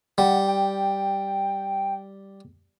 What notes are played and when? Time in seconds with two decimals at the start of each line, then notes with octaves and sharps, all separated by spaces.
0.18 G3 F#5
0.48 G5